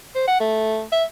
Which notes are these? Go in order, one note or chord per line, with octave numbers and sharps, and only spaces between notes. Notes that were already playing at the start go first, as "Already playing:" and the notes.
C5
F#5
A3
E5